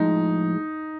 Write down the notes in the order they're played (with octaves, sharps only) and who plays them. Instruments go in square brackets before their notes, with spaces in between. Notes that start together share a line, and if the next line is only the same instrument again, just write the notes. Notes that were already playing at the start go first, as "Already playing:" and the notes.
Already playing: [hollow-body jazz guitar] A2 F3 G#3 [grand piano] D#4